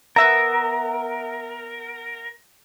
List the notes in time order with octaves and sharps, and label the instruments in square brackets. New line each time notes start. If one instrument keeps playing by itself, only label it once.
[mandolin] B3 E5 A#5 [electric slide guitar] A#4